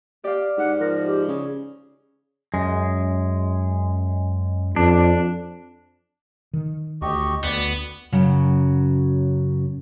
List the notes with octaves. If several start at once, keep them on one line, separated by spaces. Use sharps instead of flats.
G4 D5 F5
G#2 G4 F#5
F3 A#4
G4
C#3 G#4
F#2 G#3
F2 D4
D#3
D2 G4 D#5 C#6
D2 B3 D5
F#2 C#3 F#3